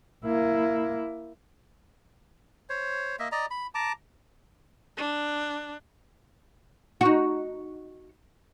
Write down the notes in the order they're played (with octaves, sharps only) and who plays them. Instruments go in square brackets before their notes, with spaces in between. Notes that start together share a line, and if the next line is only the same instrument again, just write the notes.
[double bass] A#3 E4
[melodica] C5 C#5
A#3 D#5 E5
D5 D#5 A#5
B5
A5 A#5 D6
[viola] D4
[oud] D#4 F#4